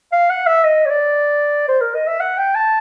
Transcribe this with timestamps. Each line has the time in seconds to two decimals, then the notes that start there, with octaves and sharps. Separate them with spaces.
0.12 F5
0.30 F#5
0.47 E5
0.64 D#5
0.86 C#5
0.90 D5
1.68 C5
1.81 A#4
1.95 D#5
2.07 E5
2.20 F#5
2.38 G5
2.55 A5